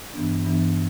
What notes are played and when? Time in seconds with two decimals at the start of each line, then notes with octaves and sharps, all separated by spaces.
0.14 G2 E3 B3 D4
0.45 G2 E3 B3 D4